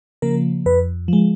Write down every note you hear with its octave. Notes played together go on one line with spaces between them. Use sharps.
C#3 F3 A#3 A#4
F2 B4
F3 G#3